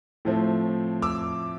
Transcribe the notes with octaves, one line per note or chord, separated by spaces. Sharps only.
A2 F3 A3 C4
D6 E6